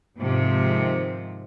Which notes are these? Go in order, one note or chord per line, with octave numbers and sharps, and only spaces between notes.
G#2 C3 D#3 F3 G#3